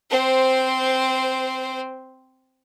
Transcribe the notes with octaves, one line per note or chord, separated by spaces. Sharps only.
C4 C5